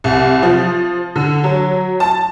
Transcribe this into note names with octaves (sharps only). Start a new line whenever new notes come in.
C2
F3
D3
F#3
A5